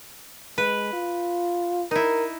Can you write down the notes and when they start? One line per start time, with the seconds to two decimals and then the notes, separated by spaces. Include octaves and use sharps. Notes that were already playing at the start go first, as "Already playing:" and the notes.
0.58 G#3 B4
0.93 F4
1.91 D#4 E4 A#4